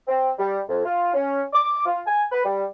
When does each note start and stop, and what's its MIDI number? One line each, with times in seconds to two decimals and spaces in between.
0.08 0.31 60
0.38 0.59 55
0.68 0.85 41
0.85 1.13 65
1.14 1.42 61
1.53 1.84 86
1.85 2.00 65
2.06 2.24 80
2.31 2.42 71
2.45 2.64 55